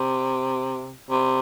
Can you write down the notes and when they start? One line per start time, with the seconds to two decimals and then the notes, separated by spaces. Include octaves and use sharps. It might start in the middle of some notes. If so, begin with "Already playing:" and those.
Already playing: C3
1.10 C3